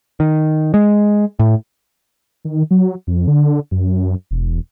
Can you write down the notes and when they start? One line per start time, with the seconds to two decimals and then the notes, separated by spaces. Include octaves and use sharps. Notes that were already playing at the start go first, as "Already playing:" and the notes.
0.20 D#3
0.74 G#3
1.39 A2
2.45 D#3
2.71 F#3
3.07 F2
3.27 D3
3.71 F#2
4.31 E1